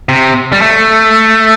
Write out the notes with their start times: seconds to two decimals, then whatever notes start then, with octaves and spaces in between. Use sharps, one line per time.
0.09 C3
0.52 G3
0.61 A3